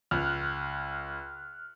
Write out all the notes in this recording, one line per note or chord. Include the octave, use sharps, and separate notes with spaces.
C#2 F6 F#6